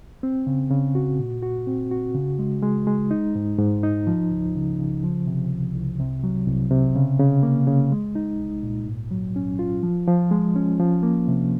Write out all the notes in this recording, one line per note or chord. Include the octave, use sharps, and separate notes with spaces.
C4
C#3
C#3
F#4
A#2
F#4
C4
F#4
C#3
G#3
G#3
G#3
D#4
G#2
G#2
D#4
F3
C#2
C#3
C#3
F3
C3
C2
C2
C3
F#3
C2
C3
C#3
C#3
A#3
C#3
G#3
D#4
C2
A#2
G#2
F#3
C#4
F4
F3
F3
G#3
C#4
F3
A#3
C3